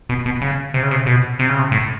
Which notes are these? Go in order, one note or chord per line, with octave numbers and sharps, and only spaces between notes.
B2
B2
C#3
C3
C#3
C3
B2
C3
C#3
C3
A2